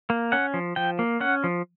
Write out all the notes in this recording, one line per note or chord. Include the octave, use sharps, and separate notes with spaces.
A#3
C#4 F#5
F3
F3 G5
A#3
C#4 F#5
F3